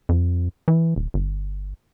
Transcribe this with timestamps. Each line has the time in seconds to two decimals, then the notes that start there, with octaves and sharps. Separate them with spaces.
0.09 F2
0.68 E3
0.96 D#1
1.14 G1